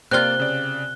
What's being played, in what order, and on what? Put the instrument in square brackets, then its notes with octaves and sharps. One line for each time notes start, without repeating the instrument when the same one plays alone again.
[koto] C3 F4 [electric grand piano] A#3 D5 [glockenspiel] F#6 G7
[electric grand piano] C#3 D5